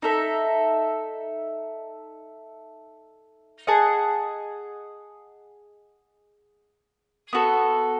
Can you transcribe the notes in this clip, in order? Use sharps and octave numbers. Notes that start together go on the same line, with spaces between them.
D#4 A4 E5
G#4 D#5 F#5 A5
B3 F#4 A4